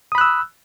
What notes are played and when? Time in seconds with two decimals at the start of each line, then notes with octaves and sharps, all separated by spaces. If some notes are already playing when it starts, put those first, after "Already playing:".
0.12 D#6
0.15 B5
0.18 F#6
0.21 E6